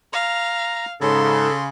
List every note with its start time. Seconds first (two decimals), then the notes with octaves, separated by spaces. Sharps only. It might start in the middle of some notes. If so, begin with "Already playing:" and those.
0.13 F5 A#5
1.02 G#2 C#3 A4 C6